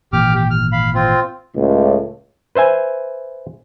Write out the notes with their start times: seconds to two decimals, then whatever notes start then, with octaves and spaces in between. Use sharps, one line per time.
0.13 G#1 A#2 E3 G4 D6 F6
0.34 G4
0.51 F6
0.72 F5 B5
0.95 C4 F4
1.56 C#2 A2
2.55 B4 C5 E5 G#5